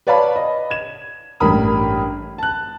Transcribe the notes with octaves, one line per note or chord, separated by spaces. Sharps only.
B4 C#5 D5 F5 A5 B5
D#5
G#6 E7
A1 G2 G3 A#4 B5 D#6
A5 F#6